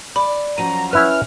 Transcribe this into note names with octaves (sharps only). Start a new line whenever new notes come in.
D5 B5
F#2 F3 F#4 A#5 D#7
C#4 E4 B4 F6 F#6